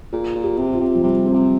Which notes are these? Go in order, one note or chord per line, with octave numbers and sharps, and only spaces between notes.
A#2 G#4
A#2
G4
C3
F4
C3
F3
C3 G3
C4
C3